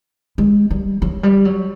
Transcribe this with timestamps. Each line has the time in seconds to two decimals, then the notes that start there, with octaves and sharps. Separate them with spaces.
0.38 G#3
0.70 G3
1.02 F#3
1.23 G3
1.45 F#3